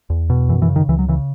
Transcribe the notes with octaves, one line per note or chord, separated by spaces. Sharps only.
E2
B2
F#2 E3
E3
C#3
D#3
C#2 E3
F#3
C#3 E3